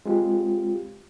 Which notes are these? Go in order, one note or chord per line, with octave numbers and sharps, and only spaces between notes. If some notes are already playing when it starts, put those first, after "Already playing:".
G#3 C4 F4 G4